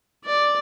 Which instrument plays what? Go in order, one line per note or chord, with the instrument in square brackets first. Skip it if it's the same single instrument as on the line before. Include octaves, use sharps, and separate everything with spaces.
[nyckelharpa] D5